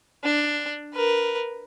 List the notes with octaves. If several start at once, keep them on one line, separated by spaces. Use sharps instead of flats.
D4
A#4 B4